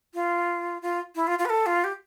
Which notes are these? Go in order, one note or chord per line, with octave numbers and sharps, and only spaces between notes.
F4
F4
E4
F4
F4
B4
A4
F4
G4